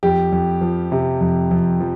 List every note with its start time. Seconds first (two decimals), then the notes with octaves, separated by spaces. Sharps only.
0.03 F2 G4
0.32 F2
0.61 F3
0.92 C3
1.21 F2
1.51 F2
1.80 F3